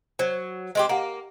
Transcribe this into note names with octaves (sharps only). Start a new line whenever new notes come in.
F#3 C5
G#3 C4 G4
A#3 G4 F#5 A#5